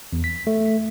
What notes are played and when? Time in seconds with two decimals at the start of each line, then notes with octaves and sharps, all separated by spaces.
0.13 E2
0.24 B6
0.47 A3